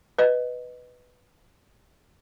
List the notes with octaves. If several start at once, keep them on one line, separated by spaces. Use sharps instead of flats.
B4 D#5